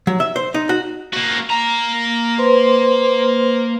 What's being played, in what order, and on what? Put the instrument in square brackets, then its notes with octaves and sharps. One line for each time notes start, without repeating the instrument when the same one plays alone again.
[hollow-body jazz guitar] F#3
E5
C5
D#4
F#4
[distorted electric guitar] A#3 F#4
A#3 A#5
[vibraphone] B4 C5 C6